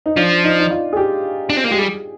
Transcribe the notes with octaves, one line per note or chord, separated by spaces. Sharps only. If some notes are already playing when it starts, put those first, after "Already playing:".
D#4
F3 D4
D#4
D#4
F4
G#4
G4
D4
C4
A#3
G#3 G4
G3 G#4